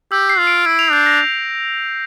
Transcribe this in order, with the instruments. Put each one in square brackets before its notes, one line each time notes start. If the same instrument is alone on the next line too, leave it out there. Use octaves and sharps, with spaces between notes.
[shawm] G4 [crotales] E6
[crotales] C7
[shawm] F4
[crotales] D7
[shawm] E4 [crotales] D7
[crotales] F7
[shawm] D4 [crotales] G6
[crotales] A#6